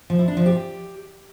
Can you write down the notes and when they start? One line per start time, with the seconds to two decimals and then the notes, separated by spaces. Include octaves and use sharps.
0.10 F3
0.19 E4
0.28 D4
0.37 F3
0.46 G4